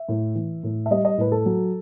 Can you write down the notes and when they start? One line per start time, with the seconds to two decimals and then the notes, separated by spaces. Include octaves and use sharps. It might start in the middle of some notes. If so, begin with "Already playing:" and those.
Already playing: E5
0.09 A2
0.35 E3
0.63 A2
0.86 E5
0.91 G3 D#5
1.05 D#5
1.18 A2 B4
1.32 A4
1.46 F#3